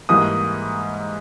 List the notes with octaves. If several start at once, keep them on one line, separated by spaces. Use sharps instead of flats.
G#2 E3 G3 A#3 D#6